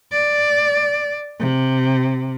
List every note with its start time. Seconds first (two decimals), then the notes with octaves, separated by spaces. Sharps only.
0.12 D5
1.40 C3